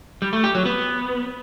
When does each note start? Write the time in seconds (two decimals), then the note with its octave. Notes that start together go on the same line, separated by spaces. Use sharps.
0.22 G3
0.33 A3
0.44 G4
0.55 F#3
0.66 B3